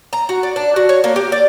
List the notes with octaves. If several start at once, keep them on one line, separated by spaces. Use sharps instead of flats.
A#5
F#4
D5
D4
F#4
C#5
A#3
G4
D5